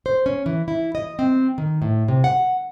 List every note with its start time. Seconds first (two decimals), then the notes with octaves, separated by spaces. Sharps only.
0.06 C5
0.26 C#4
0.46 E3
0.68 E4
0.95 D#5
1.19 C4
1.58 D#3
1.82 A2
2.08 C3
2.24 F#5